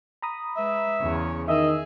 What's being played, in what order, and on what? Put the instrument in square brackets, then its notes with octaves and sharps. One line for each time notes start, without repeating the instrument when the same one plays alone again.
[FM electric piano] A#5 B5 D#6
[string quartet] G#3 B4 [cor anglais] E5
[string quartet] E2 C#3 C#5
[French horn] D#3 [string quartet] G#4 [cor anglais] D#5 [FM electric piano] E5 E6